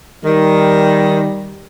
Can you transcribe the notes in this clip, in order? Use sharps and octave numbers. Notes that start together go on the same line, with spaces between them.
D#3 G3